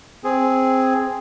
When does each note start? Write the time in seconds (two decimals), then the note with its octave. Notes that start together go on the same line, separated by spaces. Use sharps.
0.24 C4 G#4